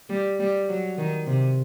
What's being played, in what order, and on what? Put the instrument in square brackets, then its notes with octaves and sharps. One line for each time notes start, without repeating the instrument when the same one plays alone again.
[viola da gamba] G3
G3
F#3
D#3
C3